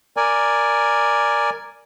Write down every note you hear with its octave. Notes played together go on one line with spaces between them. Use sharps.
A#4 D5 G#5